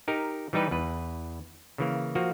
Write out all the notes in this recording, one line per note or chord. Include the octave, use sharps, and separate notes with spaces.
D#4 G4 A#4
E3 G3 D#4 G4 B4
E2 B4
C#3 E3 A#3
F3 A#3 F#4